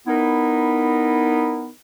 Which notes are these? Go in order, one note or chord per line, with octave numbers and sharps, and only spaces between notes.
B3 D#4 E4 A#4